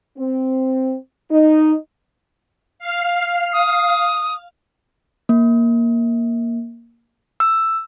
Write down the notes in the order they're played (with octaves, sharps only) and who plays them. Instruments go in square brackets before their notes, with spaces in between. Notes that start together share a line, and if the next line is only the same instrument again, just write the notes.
[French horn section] C4
D#4
[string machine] F5
[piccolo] D#6
[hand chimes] A#3
E6